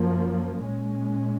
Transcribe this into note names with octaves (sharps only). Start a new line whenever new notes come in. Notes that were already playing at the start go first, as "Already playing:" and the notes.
Already playing: F#2 F3 A#3
A#2 G#3 C#4